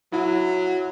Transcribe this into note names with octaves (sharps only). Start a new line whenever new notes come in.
F#3 E4